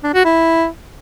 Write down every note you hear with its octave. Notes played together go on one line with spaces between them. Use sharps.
D4
F#4
E4